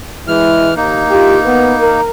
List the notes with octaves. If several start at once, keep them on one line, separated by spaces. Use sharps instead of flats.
E3 G#3 E4 F6
D#2 A#3 D#4
E4 F4 G4
B3
A#4